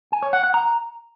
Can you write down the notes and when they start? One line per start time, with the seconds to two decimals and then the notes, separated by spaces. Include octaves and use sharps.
0.12 G#5
0.23 C#5
0.33 F#5
0.43 F#5
0.54 A#5